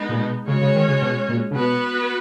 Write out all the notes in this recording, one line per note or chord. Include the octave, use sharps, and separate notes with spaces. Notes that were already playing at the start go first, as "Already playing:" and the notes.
Already playing: G#3 B3 D#4
A#2
B2
C#3 G#3 C#4 F#4 C#5
C#3
D#3
C#3
B2
A#2
C#3
B2 B3 F#4 B4